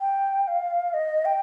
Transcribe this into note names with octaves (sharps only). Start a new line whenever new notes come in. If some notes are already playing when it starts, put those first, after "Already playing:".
G5
F5
D#5
G5